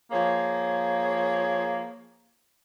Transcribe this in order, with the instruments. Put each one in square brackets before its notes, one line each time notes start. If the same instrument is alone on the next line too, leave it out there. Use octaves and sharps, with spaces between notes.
[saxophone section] F3 A#3 G#4 C#5